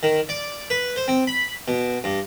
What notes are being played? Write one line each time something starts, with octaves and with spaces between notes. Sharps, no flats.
D#3
D5
B4
C5
C4
B5
B2
G2